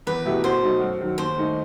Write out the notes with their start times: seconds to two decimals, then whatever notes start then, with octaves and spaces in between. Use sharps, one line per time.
0.07 E2 B4
0.25 B2 A3 E4 G4
0.44 B2 C5
0.63 F#3 A3 D#4
0.81 F#2
1.00 D#3 F#3
1.18 D#2 C5
1.37 D#3 A3 D#4